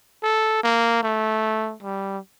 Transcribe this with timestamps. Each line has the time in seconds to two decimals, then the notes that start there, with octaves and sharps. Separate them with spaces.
0.23 A4
0.63 A#3
1.03 A3
1.83 G3